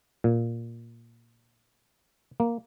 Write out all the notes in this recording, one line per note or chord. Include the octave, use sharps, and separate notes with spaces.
A#2
A#3